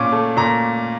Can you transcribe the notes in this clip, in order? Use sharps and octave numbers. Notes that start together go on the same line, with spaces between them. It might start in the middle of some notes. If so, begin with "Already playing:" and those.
Already playing: A#2 C#4 C#6 D6
A3
A#2 A#5